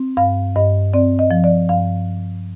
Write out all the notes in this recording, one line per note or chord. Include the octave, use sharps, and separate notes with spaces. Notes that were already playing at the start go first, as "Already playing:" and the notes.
Already playing: C4
G2 F5
G2 D#5
C4 D5
D#5
F3
D5
G2 F5